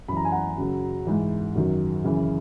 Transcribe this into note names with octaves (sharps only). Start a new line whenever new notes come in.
F#2 E3 A#5 B5
G#5
F#5 A#5
F#2 C#3 F#3
G#2 E3
F#2 D#3 F#3
F#2 C#3 E3